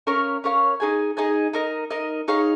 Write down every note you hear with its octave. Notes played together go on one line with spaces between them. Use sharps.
C#4 A#4 C#5 F5
C#4 A#4 C#5 F5
D#4 G#4 D#5 G#5
D#4 G#4 D#5 G#5
D#4 A#4 D#5
D#4 A#4 D#5
D#4 G#4 C#5 F5